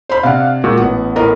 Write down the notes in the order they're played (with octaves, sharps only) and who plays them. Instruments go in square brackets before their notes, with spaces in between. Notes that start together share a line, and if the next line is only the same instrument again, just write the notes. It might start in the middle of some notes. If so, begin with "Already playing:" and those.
[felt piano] C5 B5
[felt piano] C3 D4 [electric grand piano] F5 F#5
[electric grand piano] A#2 G#3 F#4
[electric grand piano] A1 B3 [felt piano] F#5
[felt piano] A2 A#4 D#5